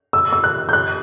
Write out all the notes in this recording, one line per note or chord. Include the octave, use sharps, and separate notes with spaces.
E6
E6
F#6
G6
F#6